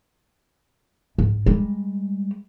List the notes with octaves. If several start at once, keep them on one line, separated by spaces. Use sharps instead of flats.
G#2
G3 G#3